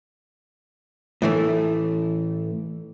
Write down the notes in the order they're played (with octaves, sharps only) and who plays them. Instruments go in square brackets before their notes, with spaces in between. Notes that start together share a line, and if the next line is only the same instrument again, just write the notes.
[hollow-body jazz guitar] A2 E3 A3